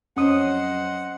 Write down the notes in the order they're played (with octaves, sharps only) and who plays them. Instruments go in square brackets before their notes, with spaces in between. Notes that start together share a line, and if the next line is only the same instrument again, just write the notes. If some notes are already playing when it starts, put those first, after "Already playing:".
[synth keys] F2 F#3 [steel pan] C#4 D#6 [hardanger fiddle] C5 D#5 [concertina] F#5